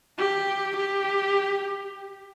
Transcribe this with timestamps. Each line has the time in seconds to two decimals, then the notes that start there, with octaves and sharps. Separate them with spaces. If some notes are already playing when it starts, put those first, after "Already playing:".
0.18 G4
0.76 G4